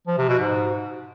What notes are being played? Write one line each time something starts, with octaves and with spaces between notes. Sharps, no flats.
F3
C3
B2
G#2